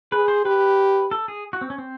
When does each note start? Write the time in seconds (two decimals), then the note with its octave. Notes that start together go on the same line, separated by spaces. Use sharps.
0.12 G#4 B4
0.28 C5
0.45 G4 B4
1.11 A4
1.28 G#4
1.53 F#4
1.61 C4
1.70 C#4
1.78 C4